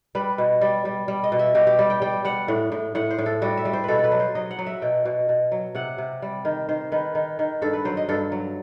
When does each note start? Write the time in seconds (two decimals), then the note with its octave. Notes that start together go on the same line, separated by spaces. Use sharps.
0.15 G3 B4
0.38 B2
0.61 G3
0.85 G3
1.08 G3
1.24 D#5
1.32 B2
1.39 E5
1.55 B2 G4
1.67 G4
1.79 G3
1.90 G5
2.02 G3 G5
2.25 G3 F#5
2.48 A2
2.72 A2
2.95 A2 F#5
3.11 C5
3.19 A2
3.26 A4
3.42 G3 F#4
3.57 E5
3.65 G3
3.73 C5
3.84 B2 A4 B4
3.99 A4
4.04 B4
4.12 F#3
4.20 C5
4.35 F#3 D#5
4.51 F#5
4.59 F#3
4.66 E5
4.82 B2 G5
5.05 B2
5.29 B2
5.52 F#3
5.75 C3 F#5
5.98 C3
6.22 G3
6.45 D#3
6.69 D#3 C5
6.92 D#3 B4
7.15 D#3
7.39 D#3
7.62 G2 A4
7.73 B4
7.85 F#3 C5
7.97 D#5
8.09 G2 A4
8.32 F#3